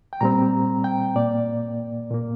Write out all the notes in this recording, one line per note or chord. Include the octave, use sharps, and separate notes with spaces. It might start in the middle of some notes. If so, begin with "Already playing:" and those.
G5
A#2 G3 C4 A#5
G5
A#2 A#3 D5
A#2 A#3